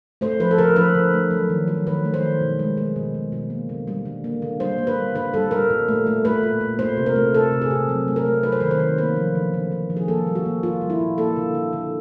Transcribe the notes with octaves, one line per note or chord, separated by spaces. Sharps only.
A3 C5
F3 B4
A4
D3 A#4
F3 B4
D3
A3
F#3
D#3
F#3
D#3 B4
A3
C5
D#3
B2
G#3
G#3
B2
B2
B2
A#3
D3
G3
D3
A#3
D3
G3 C5
A#3
B4
G3
D3 B4
G3 A4
G3 A#4
A#2
A3
A3
A3 B4
A#2
A#2
A3 C5
C3
A#4
A3
C3 A4
C3
G#4
C3
F#3
A3
A#4
A3
F#3 B4
C5
D#3 B4
C5
D#3
A#3 B4
F3
D3
D3
D3
F3
G#4
A#3 A4
G3
F#4
A#3
A#3 F4
G3
E4
A#2
A#3 A4
D3
D3
D3